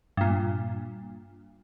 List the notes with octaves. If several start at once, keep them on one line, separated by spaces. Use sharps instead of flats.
G2 A#2